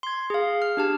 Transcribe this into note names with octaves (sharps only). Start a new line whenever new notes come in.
C6 G#6
G#4 F5
F6
D4 G4 A5